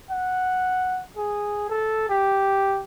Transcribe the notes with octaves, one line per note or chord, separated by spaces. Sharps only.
F#5
G#4
A4
G4